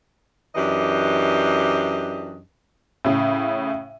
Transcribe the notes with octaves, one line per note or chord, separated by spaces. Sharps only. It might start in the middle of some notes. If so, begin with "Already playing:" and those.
F#2 E3 D4 G4 D#5
A2 C#3